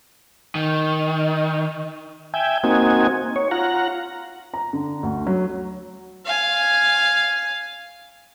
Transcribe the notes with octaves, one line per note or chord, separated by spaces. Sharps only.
D#3
E5 G5 G#5
A#3 C4 D#4 F#4 G#5
C#5
F4 F#5 A#5
A#5
D3
D2
F#3
F5 G#5